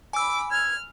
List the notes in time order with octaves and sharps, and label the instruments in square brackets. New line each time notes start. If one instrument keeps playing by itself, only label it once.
[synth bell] G#5 E6 [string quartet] B5 D6
[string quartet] F6 [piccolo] G#6